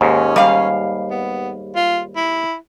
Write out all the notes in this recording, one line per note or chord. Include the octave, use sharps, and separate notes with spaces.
D#2 G#2 C#4
G3 F5
B3
F4
E4